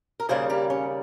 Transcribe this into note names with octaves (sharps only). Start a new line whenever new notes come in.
A#4
D#2 C#3 G3 A#3 G#4 C5
G4 A#4
C#4